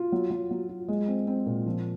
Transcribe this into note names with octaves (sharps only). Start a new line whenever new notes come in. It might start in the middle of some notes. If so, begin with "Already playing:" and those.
Already playing: F4
F#3
F#3
F#3
F4
G#3
C4
C4
A#2
F3